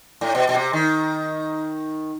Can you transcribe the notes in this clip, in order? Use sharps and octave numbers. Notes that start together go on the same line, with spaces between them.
A2
B2
B2
C3
D#3